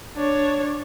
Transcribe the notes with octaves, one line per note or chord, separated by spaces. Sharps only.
D4 C#5